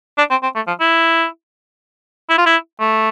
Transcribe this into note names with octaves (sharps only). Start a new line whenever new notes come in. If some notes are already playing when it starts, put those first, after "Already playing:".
D4
C4
C4
A3
F3
E4
E4
F4
E4
A3